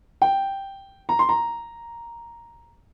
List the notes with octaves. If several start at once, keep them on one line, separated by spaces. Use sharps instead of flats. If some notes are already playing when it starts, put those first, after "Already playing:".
G5
A#5
C6
A#5